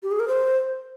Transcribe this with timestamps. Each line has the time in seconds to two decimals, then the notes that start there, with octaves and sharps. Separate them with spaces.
0.03 G4
0.11 G#4
0.20 A#4
0.28 C5